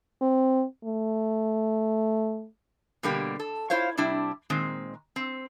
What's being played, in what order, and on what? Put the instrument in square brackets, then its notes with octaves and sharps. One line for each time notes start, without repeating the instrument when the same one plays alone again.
[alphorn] C4
A3
[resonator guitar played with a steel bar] B2 D3 G3 A#3 G4
A4
E4 F4 C5 C#5 F5
C3 G3 D4 E4
A#2 D#3 G#3 C4
C4